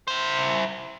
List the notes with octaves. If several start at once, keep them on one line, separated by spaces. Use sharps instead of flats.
E4 C5